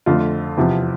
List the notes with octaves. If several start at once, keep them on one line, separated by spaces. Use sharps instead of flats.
F2 D3 A3 F4
E2 C3 F3